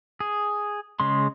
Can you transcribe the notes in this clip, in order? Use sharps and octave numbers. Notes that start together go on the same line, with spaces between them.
G#4
C#3 G#3 C6